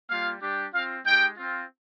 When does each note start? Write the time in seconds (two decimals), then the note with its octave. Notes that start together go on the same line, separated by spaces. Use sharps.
0.09 G3 A#3 F4 F5
0.41 G3 D4 G4
0.73 C4 F4 F5
1.05 G#3 D#4 G4 G5
1.37 C4 F4